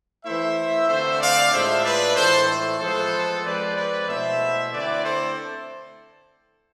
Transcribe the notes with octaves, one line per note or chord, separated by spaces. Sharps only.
E3 A3 E4 C5 E5
D3 A3 C4 F4 C5 E5
D5 F5
A2 G#3 D4 F4 C5 E5
B4 D5
A2 E3 A3 A4 C5
F3 G#3 B3 F4 A4 C5
F3 G#3 C4 B4 D5
B4 D5
B2 A3 E4 C5 E5
D3 A3 C4 E4 B4 D5
A4 C5